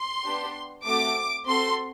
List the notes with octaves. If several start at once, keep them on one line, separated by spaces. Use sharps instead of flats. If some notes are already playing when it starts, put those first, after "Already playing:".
Already playing: C6
B3 D4 G4
A3 C4 F#4 A4 D6
C4 F#4 A4 C6